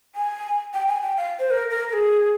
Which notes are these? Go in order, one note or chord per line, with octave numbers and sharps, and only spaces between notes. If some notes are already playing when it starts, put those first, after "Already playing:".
G#5
G5
G#5
G5
F5
C5
A#4
A#4
A#4
G#4